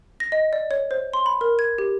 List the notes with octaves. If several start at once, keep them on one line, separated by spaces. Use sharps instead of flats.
A#6
D#5
D5
C#5
C5
C6
B5
A#4
G#6
G4